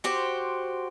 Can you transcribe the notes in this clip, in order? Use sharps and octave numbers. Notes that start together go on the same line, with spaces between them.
F#4 G4 C5